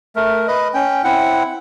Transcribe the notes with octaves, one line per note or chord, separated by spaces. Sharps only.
A3 A#4
B4 D#5
C#4 G5
C4 E4 F#5